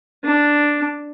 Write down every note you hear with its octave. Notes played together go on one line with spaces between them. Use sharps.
D4